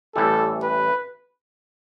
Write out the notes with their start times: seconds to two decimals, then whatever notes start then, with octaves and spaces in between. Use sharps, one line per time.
0.15 A1 A2 E3 G3 A4
0.62 B4